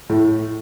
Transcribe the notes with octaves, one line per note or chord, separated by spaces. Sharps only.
A2